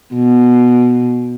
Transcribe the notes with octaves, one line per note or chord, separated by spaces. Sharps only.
B2